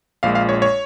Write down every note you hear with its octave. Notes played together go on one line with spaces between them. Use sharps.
A#1 A#2 G#3 F5
F5
C#5
C#5